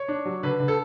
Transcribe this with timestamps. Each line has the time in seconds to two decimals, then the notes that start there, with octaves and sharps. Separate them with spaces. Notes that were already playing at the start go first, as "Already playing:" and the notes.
Already playing: C#5
0.08 D4
0.25 F#3
0.43 D3 B4
0.60 D3
0.68 A4